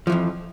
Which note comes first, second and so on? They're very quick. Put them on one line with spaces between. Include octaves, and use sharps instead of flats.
F3 E3 F2